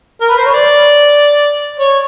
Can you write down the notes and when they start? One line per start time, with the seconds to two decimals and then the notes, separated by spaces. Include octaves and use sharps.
0.21 A#4
0.29 B4
0.37 C5
0.45 C#5
0.53 D5
1.79 C#5